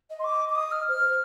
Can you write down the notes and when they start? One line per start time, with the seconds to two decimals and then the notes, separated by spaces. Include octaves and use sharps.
0.09 D#5
0.20 C6
0.24 D6
0.49 D6
0.55 D#6
0.72 F6
0.87 C5 F6
0.98 C5
1.08 C5